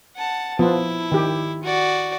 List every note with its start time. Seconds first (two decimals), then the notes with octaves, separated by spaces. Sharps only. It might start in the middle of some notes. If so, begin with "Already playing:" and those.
0.16 F#5 A5
0.59 F3 B3 E4 F4
1.12 D#3 G4
1.63 F#4 D5